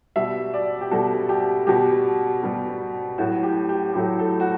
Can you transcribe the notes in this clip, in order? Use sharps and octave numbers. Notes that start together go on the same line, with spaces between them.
B2 G3 E5
D5
G4
B2 G3 A4
G4
B2 G3 G4
B2 G3
A2 F#3 A3 F#4
G4
G4
A2 F#3 A3 G4
A4
F#4